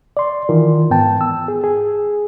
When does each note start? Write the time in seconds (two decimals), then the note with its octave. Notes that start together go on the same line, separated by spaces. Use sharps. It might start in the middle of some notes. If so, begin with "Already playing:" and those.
0.17 D5 C6
0.49 D#3 E3 F4 A#4
0.90 G#2 B3 G5 A5
1.21 E6
1.48 G#4
1.64 G#4